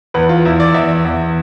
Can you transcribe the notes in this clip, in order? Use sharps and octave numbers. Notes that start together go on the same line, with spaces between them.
E2 B4
F4
E2 E4
D5
E2 E5
E2